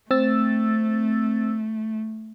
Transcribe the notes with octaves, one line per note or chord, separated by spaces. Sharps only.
A3 C4 E6 A6